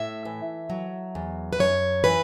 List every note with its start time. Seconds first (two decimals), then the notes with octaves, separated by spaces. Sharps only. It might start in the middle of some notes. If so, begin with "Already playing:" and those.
Already playing: A2 E5
0.25 E3
0.70 F#3
1.15 E2
1.53 B4
1.60 F#2 C#5
2.04 E3 B4